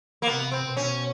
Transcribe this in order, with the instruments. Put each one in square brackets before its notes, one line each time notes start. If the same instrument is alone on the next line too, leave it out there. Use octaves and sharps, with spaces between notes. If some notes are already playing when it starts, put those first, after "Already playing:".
[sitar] A#3
[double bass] C3 [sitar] B3
[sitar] C4
[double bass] B2
[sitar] C#4